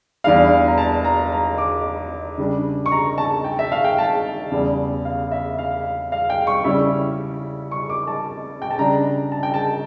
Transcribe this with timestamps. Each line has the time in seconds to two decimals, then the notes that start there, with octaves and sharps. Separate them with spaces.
0.24 E2 E3 G3 D4 F5
0.68 A#5
0.78 A5
1.05 A#5
1.32 A#5
1.58 D6
2.38 C#3 G3 D4
2.86 C#6
2.92 A#5
3.18 A5
3.44 G5
3.59 E5
3.72 F5
3.84 G5
3.98 A5
4.51 E2 C#3 G3
5.05 F5
5.32 E5
5.58 F5
6.12 F5
6.30 G5
6.47 C#6
6.64 C#3 G3 C#4 E4
7.71 C#6
7.90 D6
8.07 A5
8.62 G5
8.71 A5
8.79 C#3 G3 D4 A#5
9.32 A5
9.43 G5
9.54 A5